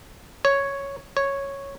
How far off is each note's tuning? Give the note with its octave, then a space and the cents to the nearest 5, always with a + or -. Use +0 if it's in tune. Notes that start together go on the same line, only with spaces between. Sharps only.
C#5 +0
C#5 -5